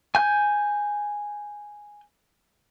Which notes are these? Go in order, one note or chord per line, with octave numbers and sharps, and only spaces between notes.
G#5 G6